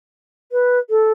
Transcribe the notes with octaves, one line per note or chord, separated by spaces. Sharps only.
B4
A4